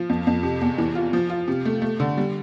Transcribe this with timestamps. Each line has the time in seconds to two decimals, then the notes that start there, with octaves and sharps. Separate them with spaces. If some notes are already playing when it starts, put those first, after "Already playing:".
Already playing: F3
0.09 F2
0.27 F2
0.43 C3
0.61 E2
0.78 E3
0.95 F4
1.13 F3
1.30 F4
1.48 C3
1.65 A3
1.82 A3
2.00 D3
2.17 G3